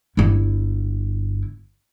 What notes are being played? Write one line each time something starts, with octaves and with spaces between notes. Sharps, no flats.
G1 E4